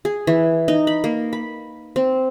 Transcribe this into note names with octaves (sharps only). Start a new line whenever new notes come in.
G#4
E3
D#4
B5
A#3
B5
C4